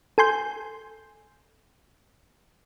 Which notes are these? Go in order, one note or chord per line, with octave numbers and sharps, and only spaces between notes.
A4 G#5 C6 G6